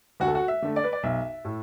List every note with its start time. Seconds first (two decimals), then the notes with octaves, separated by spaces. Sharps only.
0.20 D2 F#4
0.27 A4
0.35 F#4
0.48 E5
0.62 D3 A3
0.76 D5
0.84 B4
0.92 D5
1.03 B1 E5
1.45 A2